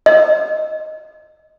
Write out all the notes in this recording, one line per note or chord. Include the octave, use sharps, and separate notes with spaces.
D#5